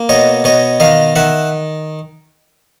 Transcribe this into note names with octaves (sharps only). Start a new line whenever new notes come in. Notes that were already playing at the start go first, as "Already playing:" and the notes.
Already playing: A#3
B2 C#5 D#5
B2 C#5 D#5
D#3 D#5 F5
D#3 E5 F#5